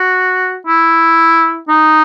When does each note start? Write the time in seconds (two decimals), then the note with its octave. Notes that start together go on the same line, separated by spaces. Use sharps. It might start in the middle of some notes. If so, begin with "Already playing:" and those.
Already playing: F#4
0.67 E4
1.68 D#4